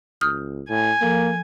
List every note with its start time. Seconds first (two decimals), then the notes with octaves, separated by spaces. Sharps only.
0.21 C#2 D#6 F6 G6
0.69 A2 G#5
1.01 F3 A#3 A4